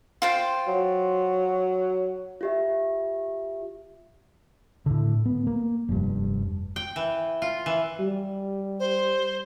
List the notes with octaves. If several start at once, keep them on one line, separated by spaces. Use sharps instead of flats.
F4 C5 G5
F#3
F4 G4 E5
A2 D3
B3
A#3
F1 G2
G5
E3
F4
E3
G3
C5